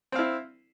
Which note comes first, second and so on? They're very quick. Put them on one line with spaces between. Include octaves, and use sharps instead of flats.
C4 F5 E4